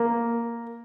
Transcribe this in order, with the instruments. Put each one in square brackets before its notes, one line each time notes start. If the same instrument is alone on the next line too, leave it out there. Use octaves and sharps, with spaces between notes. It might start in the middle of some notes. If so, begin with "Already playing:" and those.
Already playing: [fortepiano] A#3